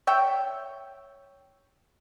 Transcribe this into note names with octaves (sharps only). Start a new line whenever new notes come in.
C#5 E5 G5